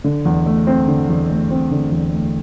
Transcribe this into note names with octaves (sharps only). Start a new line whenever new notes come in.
D3
E2
A3
C4
D3
E2
A3
C4
D3
E2
A3